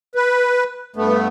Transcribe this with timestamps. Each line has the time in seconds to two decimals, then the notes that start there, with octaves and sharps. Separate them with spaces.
0.15 B4
0.96 G2 A3 B3